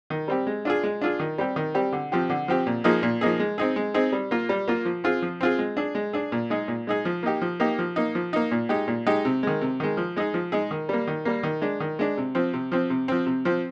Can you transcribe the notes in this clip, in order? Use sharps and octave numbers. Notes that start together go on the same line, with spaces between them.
D#3
G3 C4 G4
G#3
D4 F4 G#4
G#3
D4 F4 G#4
D#3
G3 C4 G4
D#3
G3 C4 G4
D3
F3 C4 G4
D3
F3 C4 G4
A#2
F3 A#3 D#4 G#4
A#2
F3 A#3 D#4 G#4
G#3
C4 D#4 G#4
G#3
C4 D#4 G#4
G3
A#3 F4
G3
A#3 F4
F3
C4 F4 G#4
F3
C4 F4 G#4
G#3
D4 G#4
G#3
D4 G#4
A#2
G#3 D#4 G#4
A#2
G#3 D#4 G#4
F3
A#3 D#4 G4
F3
A#3 D#4 G4
F3
A#3 D#4
F3
A#3 D#4
A#2
G#3 D#4 G4
A#2
G#3 D#4 G4
C3
D#3 G#3
C3
D#3 G#3
F3
G#3 D#4 G#4
F3
G#3 D#4 G#4
D#3
G3 A#3
D#3
G3 A#3
D#3
G#3 D4
D#3
G#3 D4
C3
F3 C4
C3
F3 C4
C3
F3 C4
C3
F3 C4